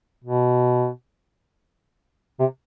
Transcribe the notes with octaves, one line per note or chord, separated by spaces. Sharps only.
B2
C3